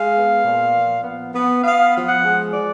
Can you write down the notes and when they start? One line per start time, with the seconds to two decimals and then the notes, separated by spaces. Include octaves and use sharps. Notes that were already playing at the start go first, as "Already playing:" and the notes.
Already playing: G#3 F5
0.15 B3
0.44 A#2
0.75 F3
1.03 B3
1.34 B3
1.63 B3 F5
1.93 F3
2.08 F#5
2.22 G#3
2.53 F3 D5